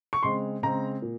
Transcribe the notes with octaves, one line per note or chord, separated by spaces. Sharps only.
C#6
C#3 G#3 C4 C6
C#3 G#3 C4 A#5
A#2